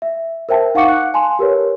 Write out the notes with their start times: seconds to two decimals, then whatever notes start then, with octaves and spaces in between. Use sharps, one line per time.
0.02 E5
0.49 A#4 C5 E5 G5 A5
0.75 D#4 F5 F#5 C#6 D6 C#7
0.89 F#6 C#7
1.14 F5 G#5 A5 C6
1.39 G4 A#4 B4 C#5